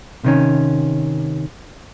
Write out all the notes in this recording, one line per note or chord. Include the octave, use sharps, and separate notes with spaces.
C3 D#3 C#4